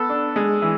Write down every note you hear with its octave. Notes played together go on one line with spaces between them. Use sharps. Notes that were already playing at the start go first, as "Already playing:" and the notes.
Already playing: B3 A4
D4
G#3
E3